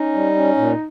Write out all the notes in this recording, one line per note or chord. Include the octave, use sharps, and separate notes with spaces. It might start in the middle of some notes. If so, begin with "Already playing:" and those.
Already playing: C#4 D#4
G3
C#4
A#2